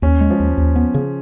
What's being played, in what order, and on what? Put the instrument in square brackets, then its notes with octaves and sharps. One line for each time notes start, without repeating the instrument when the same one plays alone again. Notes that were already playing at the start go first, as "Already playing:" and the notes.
[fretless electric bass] D#2 [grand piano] C#4
[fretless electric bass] G#3
[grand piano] F3
[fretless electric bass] D#2
D#2
B3
C#3